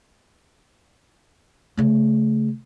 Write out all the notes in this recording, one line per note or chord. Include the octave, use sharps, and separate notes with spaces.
C#3 A3